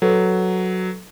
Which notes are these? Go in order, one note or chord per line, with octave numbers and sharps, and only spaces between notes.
F#3 A4 B4